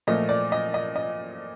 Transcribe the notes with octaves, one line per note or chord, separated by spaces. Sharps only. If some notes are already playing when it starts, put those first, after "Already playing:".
A#2 F3 A3 D#5
D5
D#5
D#5
D#5